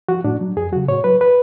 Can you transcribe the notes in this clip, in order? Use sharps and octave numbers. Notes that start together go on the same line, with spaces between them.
F3 F#4
A2 D4
F#3
F2 G#4
C#3 F#3 F#4
A2 C#5
F#3 B4
B4